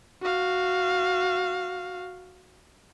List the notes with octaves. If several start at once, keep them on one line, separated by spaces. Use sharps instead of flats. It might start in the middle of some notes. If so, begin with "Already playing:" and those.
F#4 F5